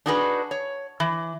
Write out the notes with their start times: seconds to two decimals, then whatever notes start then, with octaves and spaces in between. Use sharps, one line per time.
0.06 D4 D#4 F#4 G#4 A#4 B4
0.51 C#5
1.00 E3